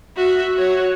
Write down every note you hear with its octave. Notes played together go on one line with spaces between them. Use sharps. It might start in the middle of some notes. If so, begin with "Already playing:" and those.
F#4 E5
F#4 C#5